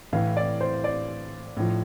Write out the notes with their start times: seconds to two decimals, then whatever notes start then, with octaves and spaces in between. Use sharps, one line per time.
0.13 A2 E3 F5
0.37 D5
0.61 C5
0.84 D5
1.57 A2 F3